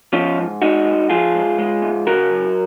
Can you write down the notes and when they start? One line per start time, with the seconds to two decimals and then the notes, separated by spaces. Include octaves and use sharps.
0.13 F3 C#4 F4
0.37 G#2
0.62 G#3 D#4 F#4
0.85 G#2
1.09 F3 F4 G#4
1.34 G#2
1.58 G#3
1.82 G#2
2.07 C#3 F#4 A#4
2.30 F#2